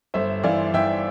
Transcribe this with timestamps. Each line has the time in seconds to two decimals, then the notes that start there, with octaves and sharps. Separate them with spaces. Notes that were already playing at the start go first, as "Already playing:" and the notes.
0.14 G1 C5 E5
0.43 E3 D5 F5
0.74 E3 E5 G5